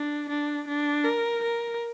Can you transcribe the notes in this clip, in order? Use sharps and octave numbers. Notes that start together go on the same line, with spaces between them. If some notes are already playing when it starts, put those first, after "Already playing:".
Already playing: D4
D4
D4
A#4
A#4